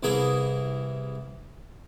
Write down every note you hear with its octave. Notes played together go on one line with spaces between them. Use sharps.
C2 E3 E4 G#4 A#4 D#6